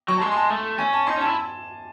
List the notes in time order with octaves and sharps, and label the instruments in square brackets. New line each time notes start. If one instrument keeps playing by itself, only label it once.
[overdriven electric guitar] F#3 [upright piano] C#6
[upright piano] A5
[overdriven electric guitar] G#3 [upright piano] C6
[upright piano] C6
A5
[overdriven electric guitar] A3
[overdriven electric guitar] C#4 [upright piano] G#5
[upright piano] A5
[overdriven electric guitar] D#4 [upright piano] C6
[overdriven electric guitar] C#4
[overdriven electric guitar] E4 [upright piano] A5